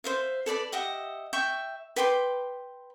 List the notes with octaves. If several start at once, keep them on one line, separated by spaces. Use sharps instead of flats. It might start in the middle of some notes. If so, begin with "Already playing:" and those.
C5 E5 F5
A4 B4 D5 B5
G4 D#5 E5 F#5
E5 G5 C#6
B4 G5 C6 D6